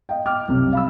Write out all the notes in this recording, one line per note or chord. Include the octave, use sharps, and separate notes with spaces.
D#5 F5 G5
G5 D6 F6
C2 F#2 C3
F5 B5 E6